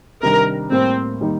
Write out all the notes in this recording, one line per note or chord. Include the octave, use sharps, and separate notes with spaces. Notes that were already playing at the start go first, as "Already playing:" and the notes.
C3 D#3 G3 D4 A#4
A2 G3 A#3 C4
D#3 G3 A#3 D#4